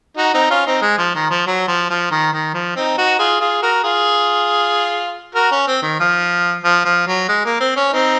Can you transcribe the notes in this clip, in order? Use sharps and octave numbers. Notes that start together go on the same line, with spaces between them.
D#4 F#4
C4 D#4
C#4 F4
C4 D#4
G#3
F3
D#3
F3
F#3
F3
F3
D#3
D#3
F3
C4 D#4
D#4 F#4
F4 G#4
F4 G#4
F#4 A#4
F4 G#4
F#4 A#4
C#4
C4
D#3
F3
F3
F3
F#3
G#3
A#3
C4
C#4
C4 D#4